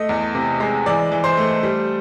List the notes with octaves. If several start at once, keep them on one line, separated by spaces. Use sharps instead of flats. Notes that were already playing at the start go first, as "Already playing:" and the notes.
Already playing: A3 D#5
E2
C3
G#3
E3 D5
E3
C5
A3
G3